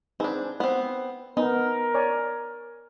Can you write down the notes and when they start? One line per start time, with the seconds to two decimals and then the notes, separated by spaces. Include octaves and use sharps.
0.20 C4 D4 D#4 G#4 B4
0.60 B3 C4
1.37 B3 D#4 A#4
1.95 C#5 D5 G#5